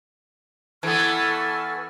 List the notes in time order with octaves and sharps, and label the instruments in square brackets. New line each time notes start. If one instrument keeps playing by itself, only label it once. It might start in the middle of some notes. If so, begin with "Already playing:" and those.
[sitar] E3 B3 [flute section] A4 C#6 F6